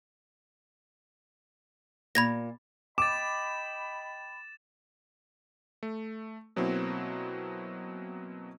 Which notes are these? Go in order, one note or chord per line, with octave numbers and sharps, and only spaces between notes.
A#2 B5 G#6 A#6
D#5 G5 B5 D6 A6 E7
A3
B2 F#3 A#3 C4 E4 F#4